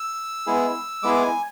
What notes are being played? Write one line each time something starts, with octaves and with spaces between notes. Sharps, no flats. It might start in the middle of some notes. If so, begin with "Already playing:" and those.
Already playing: E6
G#3 B3 E4 G#4
G#3 B3 E4 G#4 D6
G#5